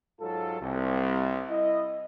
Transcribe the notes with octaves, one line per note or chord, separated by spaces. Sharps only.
G#2 F#3 F4 A4
C2
E4 D#5